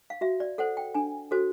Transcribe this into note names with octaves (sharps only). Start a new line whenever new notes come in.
F5
F#4 E5
D5
A4 C5 F#5
G5
D4 G#5
F#4 A4 C5